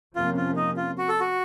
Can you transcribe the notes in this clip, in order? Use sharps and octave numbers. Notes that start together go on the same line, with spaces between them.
F2 C3 F3 A#3 C#4 F4
F4
D#4
F4
F#4
A4
F#4